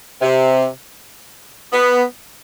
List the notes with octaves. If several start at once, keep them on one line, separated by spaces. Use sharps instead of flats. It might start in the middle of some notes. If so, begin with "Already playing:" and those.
C3
B3